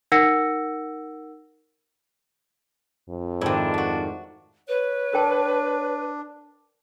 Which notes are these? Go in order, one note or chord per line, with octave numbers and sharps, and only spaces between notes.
D#4 A#4 F#5 E6 A#6 C#7
F2
G#2 D#3 C4 D4 E4
A3 F#4
B4 C#5
D4 A#4 G5 A5